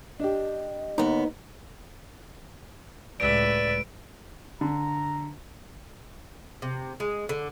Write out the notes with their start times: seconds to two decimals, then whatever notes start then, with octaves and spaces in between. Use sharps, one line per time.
0.20 D4 G4 D#5
0.98 D#2 B3 D#4
3.20 C#2 A2 B4 D5 E5 D7
4.61 D3 A#5
6.62 C3
7.00 G#3
7.29 D3